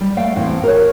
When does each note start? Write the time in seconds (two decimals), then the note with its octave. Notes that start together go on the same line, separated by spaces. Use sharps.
0.01 G3
0.17 A3 F5 G5
0.36 E2 A2 C4
0.64 A#4 C#5